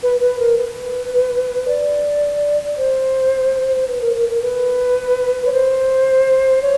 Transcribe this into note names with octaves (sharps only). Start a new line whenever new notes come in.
B4
B4
A#4
B4
D5
C5
B4
A#4
A#4
A#4
B4
C#5
C5
C#5